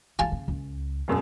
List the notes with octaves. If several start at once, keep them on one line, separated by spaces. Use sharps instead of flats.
D3 E3 F4 G#5 A5
C#3
C#2
E1 F#2